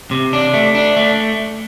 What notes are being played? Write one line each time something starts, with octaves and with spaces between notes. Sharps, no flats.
C3
D4
A3
D4
A3